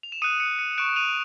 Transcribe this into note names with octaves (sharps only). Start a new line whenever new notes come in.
F7
E7
D#6 F#6 C#7 D#7
C#7 D#7
C#7 D#7
C#6 F#6 D7 E7
D#7 F7